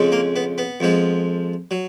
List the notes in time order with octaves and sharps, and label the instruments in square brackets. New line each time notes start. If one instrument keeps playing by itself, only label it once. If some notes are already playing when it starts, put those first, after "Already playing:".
Already playing: [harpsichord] F2 C#3 G#3
A#3
B3
B3
F2 F3 G#3
F#3